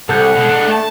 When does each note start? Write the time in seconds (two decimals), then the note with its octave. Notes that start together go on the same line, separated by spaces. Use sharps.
0.09 C2 A4 F#5 G6
0.36 B2 G#3
0.49 G#3 D4
0.67 A3 F#5 A5